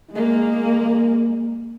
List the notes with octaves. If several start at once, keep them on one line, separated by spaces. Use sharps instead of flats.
G#3 A#3